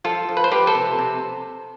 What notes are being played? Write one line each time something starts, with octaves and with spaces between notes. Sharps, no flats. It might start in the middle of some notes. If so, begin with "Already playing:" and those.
F3 F4 A4
F3
B4
C5
F3 G4 B4
A4 C5
C3
C3